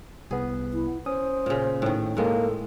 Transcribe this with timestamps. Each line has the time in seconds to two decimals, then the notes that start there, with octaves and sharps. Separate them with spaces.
0.31 C2 B3 G#4
0.74 E4
1.06 C#4 C5 D#6
1.46 A#2 C#3
1.82 A2 D#3
2.17 A2 D#3 G#3 A#3 A4